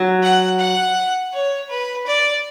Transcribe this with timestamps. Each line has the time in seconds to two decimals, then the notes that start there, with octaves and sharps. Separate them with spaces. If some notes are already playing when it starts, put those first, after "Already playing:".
Already playing: F#3
0.23 F#5
0.59 F#5
1.33 C#5
1.69 B4
2.06 D5